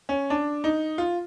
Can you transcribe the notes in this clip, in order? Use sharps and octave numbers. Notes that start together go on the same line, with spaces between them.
C#4
D4
D#4
F4